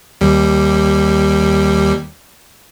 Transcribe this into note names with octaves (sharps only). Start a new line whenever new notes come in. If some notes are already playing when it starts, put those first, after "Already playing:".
D#2 G3